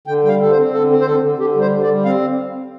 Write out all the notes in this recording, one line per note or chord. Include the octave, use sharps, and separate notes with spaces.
D3 G5
G3 G5
F5
D3 A4
C5
C4
D3 A4
C4
C5
D3 A4
D3
D3 G4
G3
C5
D3
D5
G3
C4 F5